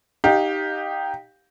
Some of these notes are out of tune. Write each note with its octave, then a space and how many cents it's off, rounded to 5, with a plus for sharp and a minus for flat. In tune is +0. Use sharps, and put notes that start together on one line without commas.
D#4 +0 G4 +0 F5 +25